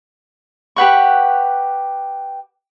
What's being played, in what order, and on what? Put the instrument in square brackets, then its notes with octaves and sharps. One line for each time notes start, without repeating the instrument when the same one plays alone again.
[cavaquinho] G4 B4 F#5 C#6